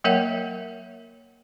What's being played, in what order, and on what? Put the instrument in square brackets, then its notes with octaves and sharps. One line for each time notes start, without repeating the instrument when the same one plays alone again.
[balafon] F#3 A#3 A#4 C#5 E5 F#5